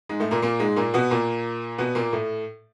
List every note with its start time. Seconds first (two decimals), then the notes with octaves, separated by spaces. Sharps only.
0.09 G#2 G#3
0.20 A2 A3
0.31 A#2 A#3
0.42 A#2 A#3
0.60 G#2 G#3
0.76 A#2 A#3
0.94 B2 B3
1.11 A#2 A#3
1.78 B2 B3
1.95 A#2 A#3
2.13 A2 A3